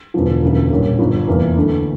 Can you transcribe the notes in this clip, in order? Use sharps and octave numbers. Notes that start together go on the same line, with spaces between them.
E1 E2 D3 F3
E1 D2 C#3 E3 A#3
A#1 A#2 G3 C#4
G1 G2 F3
F1 E2 E3 A#3
D2 D3 A3 E4